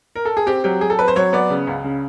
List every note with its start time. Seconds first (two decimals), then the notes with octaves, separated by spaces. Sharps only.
0.16 A#4
0.25 A4
0.37 G#4
0.46 C4 G4
0.64 F#3 G4
0.81 F#3 G#4
0.90 A4
0.99 C4 B4
1.08 C5
1.16 F#3 C#5
1.33 B3 D5
1.50 C#3
1.67 C#2
1.84 C#3